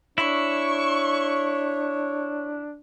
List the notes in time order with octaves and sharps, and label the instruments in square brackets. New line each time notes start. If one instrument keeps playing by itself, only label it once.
[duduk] D4 [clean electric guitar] E4 [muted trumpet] C#5 [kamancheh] C#6